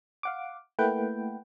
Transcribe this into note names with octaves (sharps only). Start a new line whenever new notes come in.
F5 F#5 D6
A3 A#3 E4 B4 F#5 G5